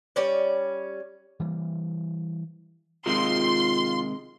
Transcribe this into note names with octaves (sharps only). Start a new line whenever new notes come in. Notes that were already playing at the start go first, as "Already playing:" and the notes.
G3 C#4 C#5 D5
E3 G3 A#3
C3 D#3 G#3 F4 C6